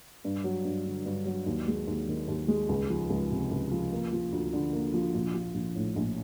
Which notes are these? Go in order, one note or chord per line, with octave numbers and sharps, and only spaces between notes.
G2
F#3
G2
D3
G2
F#3
D#2
G#3
D#2
D#3
D#2
G#3
C#2
F3
C#2
C3
C#2
F3
A#3
F3
D2
D3
A#3
F3
A#1
F3
A#1
A2
A#1